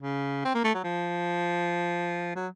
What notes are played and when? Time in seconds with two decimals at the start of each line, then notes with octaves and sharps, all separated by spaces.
0.02 C#3
0.45 C4
0.54 A#3
0.64 A3
0.74 F#3
0.84 F3
2.36 F#3